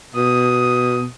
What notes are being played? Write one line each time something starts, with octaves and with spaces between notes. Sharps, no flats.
B2 D#6